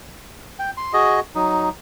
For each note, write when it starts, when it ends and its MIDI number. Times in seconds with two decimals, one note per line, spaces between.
0.59 0.70 79
0.77 0.93 84
0.93 1.20 66
0.93 1.20 68
0.93 1.20 75
1.35 1.69 54
1.35 1.69 63